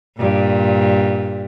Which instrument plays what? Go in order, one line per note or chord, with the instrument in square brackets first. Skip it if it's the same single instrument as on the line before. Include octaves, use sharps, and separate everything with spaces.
[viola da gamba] G2 A#2